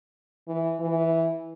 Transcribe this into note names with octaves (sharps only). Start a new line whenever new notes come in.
E3
E3